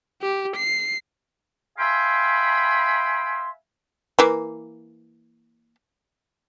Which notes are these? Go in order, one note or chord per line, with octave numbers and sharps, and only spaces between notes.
G4
C7
E5 F5 G5 G#5 B5 C6
E3 A#3